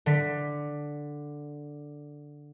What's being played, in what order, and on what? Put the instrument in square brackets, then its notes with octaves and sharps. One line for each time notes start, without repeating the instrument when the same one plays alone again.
[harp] D3 B6